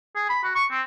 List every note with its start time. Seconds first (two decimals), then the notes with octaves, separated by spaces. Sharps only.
0.16 G#4
0.29 B5
0.43 F#4
0.55 C#6
0.71 C4